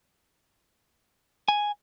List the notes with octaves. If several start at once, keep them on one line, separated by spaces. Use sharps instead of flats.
G#5